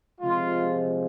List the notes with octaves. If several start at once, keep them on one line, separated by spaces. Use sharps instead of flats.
C3 F3 G#3 F4